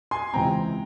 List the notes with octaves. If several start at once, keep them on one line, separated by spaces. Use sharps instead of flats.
G#5 C6
C#2 C3 E3 G#3 C4 G5 A#5